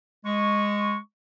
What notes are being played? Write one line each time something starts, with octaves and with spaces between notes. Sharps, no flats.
G#3 C#6